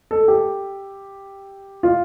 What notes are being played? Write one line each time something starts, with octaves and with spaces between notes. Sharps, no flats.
A4
G4
F4